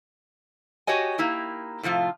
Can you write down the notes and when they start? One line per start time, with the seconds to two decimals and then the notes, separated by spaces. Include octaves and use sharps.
0.87 F#4 G4 C#5 D#5 G#5
1.18 A#3 D#4 E4 G4
1.83 A2 C3 F3 F4